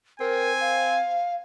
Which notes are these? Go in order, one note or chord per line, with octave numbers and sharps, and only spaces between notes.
C4 A#4 G#5
F5